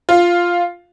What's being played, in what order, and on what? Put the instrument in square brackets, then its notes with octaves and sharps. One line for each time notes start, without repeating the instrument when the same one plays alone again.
[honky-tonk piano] F4